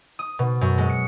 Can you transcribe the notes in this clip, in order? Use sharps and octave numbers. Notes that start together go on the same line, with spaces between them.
D#6
B2
F#2
G#3
C#7